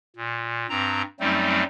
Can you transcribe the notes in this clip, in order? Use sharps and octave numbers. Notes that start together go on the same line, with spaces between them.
A#2
G2 C4 A#5
F#2 F#3 G3 A3 C4 D#4